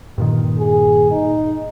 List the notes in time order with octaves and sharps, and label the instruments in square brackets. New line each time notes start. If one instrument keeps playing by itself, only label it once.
[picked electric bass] G2 A#2 D#3
[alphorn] G#4
D#4